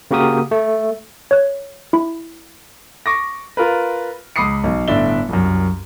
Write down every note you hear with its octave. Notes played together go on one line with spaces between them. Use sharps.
C#3 A#3 F#4 G4 A#4 D#6
A3
C#5 F#6
E4 B5
C#6 D6 A#6
F4 A#4 B4
C#2 B5 D6 D#6 C7 C#7
B1
G1 A2 D4 D5 E5 G7
C2 F#2